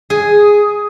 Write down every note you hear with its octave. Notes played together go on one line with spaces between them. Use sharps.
G#4